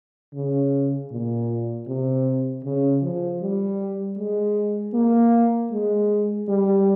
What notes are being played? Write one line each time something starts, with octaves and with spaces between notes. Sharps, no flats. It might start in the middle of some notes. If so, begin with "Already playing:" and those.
C#3
A#2
C3
C#3
F3
G3
G#3
A#3
G#3
G3